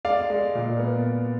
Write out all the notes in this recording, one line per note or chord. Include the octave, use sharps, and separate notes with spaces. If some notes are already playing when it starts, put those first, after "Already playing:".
G#3 D5 F5
G#3
A#2
B3